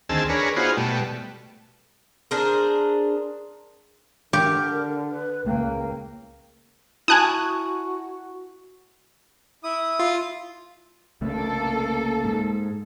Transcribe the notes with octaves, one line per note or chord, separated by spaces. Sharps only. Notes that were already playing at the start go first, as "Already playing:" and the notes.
D2 D#3 C4 G#4 A5 E6
D4 G#4 A#4 B4 C#5
B3 D#4 F4 F#4 G#4 C5
B2 G3 A3
D4 G#4 A#4 C5
D3 G4 A#4
B4
C#2 A#3 G5
E4 F#4 G#5 A5 B5 D#6 F#6 G#6
E4 D#6
F4
C2 C#3 A3 A#3 A4
G#2